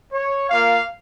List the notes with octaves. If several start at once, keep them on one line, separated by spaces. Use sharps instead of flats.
C#5
A#3 F4 F5